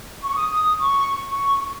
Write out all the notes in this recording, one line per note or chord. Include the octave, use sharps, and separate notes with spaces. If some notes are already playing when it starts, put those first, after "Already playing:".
C#6
D#6
C#6
C#6